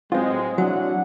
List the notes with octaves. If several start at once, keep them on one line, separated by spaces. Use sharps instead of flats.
A2 F#3 G#3 C4 F4
F#3 D4 E4 F#5